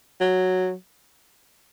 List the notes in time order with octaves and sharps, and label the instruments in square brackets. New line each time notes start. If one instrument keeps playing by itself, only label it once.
[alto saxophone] F#3